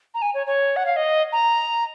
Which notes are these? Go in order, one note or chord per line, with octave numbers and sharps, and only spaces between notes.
A#5
G#5
C#5
C#5
F#5
F5
D#5
A#5